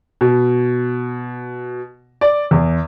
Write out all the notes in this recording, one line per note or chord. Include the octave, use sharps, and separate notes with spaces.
B2
D5
E2